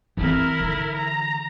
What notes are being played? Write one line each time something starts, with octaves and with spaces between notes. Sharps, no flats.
E3 C4 E4 A#4
D3 E3
A#5